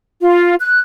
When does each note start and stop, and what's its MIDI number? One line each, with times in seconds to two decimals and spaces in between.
0.22 0.55 65
0.60 0.79 90